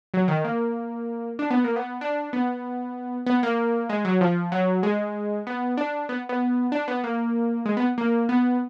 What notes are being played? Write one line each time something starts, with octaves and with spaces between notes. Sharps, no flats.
F#3
D#3
A#3
D4
B3
A#3
B3
D4
B3
B3
A#3
G#3
F#3
F3
F#3
G#3
B3
D4
B3
B3
D4
B3
A#3
G#3
B3
A#3
B3